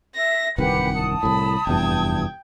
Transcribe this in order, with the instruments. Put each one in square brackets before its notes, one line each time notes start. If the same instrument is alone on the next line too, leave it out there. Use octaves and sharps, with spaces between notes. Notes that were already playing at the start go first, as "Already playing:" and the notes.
[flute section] E5 [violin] A#6
[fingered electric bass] D1 C2 D#3 [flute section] G4 B4 [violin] F#5 C#7
[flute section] A5 D#6
[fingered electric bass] C2 A2 [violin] B5
[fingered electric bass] F1 E2 G2 [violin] G5 G#6